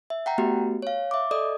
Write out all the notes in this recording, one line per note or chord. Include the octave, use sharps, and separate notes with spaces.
E5
F#5 G5 A#5
A3 B3 F#4 G4
C#5 F5
E5 D6
A4 D5 D#5 D#6